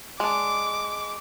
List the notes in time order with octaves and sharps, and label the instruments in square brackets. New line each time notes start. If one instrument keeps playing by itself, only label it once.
[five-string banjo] G#3 D4 [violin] D6